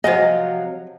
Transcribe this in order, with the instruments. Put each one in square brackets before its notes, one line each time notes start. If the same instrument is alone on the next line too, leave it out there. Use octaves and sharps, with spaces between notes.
[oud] C3 F3 F#3 [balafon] C5 F#5 G#5 [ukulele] D#5